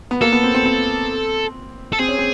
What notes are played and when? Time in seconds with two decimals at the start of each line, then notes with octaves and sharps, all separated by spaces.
0.11 B3
0.21 A#3 A4
0.32 B3
0.44 C4
0.55 C4
0.66 C4
1.93 A4
1.99 C4 G#4
2.08 C#4
2.18 C4